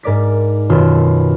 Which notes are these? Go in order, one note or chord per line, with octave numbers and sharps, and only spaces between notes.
G#2 A#4 D5 D6 B6
F#2 B2 D#3 F4 B5 E6